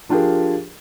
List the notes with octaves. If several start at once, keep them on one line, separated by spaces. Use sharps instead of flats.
F3 D4 F4 G4 G#4 A#4